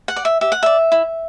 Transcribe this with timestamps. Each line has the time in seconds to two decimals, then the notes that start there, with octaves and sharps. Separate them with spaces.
0.08 F#5
0.16 D5
0.25 E5
0.41 G4 E5
0.52 F#5
0.63 D5 E5
0.92 E4